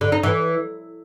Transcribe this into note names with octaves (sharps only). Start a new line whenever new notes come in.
D3
D#4
E3